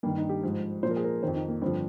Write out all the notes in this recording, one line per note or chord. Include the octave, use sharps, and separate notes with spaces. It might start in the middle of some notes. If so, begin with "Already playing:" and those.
G2 D#3 A#3
D#4
G4
G#2 F3
A#2 F3 A#4 C5
G#4
A#4
F2 D#3 C5
D#4
A#3
G2 D3 F3 C4